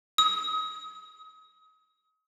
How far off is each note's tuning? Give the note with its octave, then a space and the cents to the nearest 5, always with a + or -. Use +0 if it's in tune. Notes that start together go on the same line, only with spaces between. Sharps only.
D#6 +35